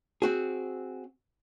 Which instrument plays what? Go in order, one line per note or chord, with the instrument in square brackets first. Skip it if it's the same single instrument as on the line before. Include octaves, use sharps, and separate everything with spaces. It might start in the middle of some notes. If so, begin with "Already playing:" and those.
[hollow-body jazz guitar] C4 F#4 G#4